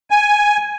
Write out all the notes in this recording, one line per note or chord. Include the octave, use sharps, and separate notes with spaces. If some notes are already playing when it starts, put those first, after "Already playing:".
G#5